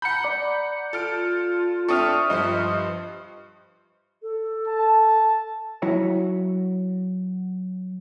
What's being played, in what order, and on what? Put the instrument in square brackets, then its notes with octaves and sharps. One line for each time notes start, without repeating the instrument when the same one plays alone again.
[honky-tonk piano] F#5 A#5 B5 [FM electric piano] G6 C#7
[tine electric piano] D5 D6
[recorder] F4 [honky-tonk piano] A4 F6 D7
[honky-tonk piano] C4 D4 A4 [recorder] E5 [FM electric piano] C#6 D#6 F6
[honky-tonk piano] G2 F3 C5 [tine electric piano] D#5
[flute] A4
[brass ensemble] A5
[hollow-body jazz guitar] F#3 E4 F#4 C#5